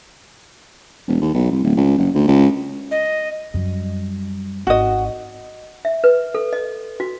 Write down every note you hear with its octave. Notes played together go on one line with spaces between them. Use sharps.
E1
D#2
B1
C2
D1
C#2
F#1
D2
C#2
D#5
F#2 G3
G#1 D#4 F#4 D#5
E5
B4
A4
D#5
F#4